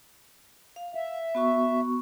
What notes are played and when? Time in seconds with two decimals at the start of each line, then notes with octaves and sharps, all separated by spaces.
0.76 F5
0.95 E5
1.35 B3 F#4 C#6